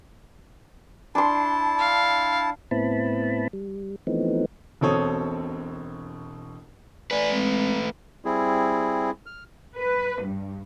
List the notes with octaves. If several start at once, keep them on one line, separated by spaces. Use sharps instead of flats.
D4 E4 A5 C6
F5
A2 B3 C4 E4 A5 B5
G3
E3 F3 A3 B3 C4 D#4
E1 B2 C4 A4 C#5 D#6
A3 B4 D5 G#5
G#3 C4
G3 C4 E4 G#4
F6
B4
G2